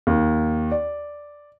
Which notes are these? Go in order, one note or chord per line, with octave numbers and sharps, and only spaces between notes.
D#2
D5